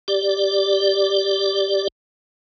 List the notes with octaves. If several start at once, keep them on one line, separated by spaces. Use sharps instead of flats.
G4 D5